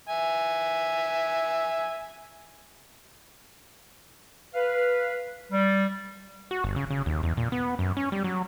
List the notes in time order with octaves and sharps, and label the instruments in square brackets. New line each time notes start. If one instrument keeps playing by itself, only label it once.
[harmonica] E5 G#5
[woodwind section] B4 F5
G3
[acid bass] F#4
G1
C#3
C#3
D#2
E2
A#2
B3
F#2
C#4
G3
F#3